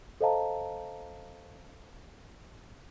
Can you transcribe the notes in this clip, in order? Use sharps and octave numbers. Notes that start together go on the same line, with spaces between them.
A4 C5 D#5 F5 A5 A#5